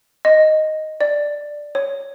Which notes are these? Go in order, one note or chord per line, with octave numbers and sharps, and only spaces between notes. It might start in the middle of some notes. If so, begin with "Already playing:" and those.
D#5
D5
C#5